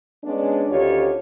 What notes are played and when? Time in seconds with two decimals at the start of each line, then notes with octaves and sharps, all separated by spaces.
0.24 G#3 B3 C#4 D4
0.68 D2 D#3 C#4 F4 G4 C#5